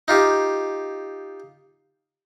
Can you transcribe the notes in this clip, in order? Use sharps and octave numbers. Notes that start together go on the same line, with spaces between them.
D#4 F4 G4